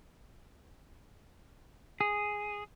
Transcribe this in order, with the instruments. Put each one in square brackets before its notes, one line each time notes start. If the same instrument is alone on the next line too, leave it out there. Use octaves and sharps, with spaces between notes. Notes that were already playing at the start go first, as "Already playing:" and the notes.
[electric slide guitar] G#4